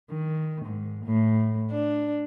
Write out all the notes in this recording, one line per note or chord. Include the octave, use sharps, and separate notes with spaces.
D#3
G#2
A2
D4